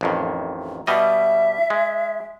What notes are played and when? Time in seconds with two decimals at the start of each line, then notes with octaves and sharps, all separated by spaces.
0.01 A1 F2 D#3
0.87 B2 G3 D#5 E5
1.70 G#3